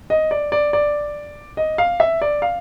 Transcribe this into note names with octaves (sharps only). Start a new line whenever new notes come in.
D#5
D5
D5
D5
D#5
F5
E5
D5
F5